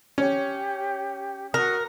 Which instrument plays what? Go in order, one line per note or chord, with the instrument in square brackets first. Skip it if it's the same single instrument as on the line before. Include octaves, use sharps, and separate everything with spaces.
[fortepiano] C#4 [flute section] G4
[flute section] F#4 D#6 F#6 [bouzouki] A#4